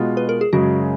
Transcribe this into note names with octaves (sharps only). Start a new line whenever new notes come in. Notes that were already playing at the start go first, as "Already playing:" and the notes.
Already playing: B2 G#3 B3 F4
B4
A#4
G#4
F#2 C#3 G#3 F#4